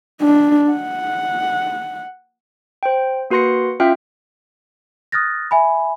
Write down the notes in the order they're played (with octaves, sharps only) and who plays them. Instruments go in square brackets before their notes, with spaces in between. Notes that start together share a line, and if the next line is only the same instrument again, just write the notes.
[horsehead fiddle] D4
F#5
[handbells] C5 G5
A#3 F#4 B4 C6 A#6 C#7
C#4 F4 E5 F5 G5 F6
[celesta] D#6 F6 F#6 A6 A#6
E5 G#5 B5